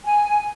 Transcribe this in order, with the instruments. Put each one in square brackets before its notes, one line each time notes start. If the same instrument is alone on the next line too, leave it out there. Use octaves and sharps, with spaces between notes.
[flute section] G#5